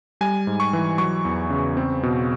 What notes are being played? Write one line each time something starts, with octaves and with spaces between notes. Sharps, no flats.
G3 G#5
G#2
C#6
E3
F#3 C#6
E2
C#3
C4
B2